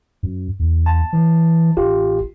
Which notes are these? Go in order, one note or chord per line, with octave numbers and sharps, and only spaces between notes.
F#2
E2
A5
E3
A1 F4 G4